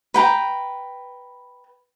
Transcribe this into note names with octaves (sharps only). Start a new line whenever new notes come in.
B4 G5 A#5